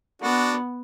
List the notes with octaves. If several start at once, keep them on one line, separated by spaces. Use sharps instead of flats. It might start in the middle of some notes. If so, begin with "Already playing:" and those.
B3 D4 F#4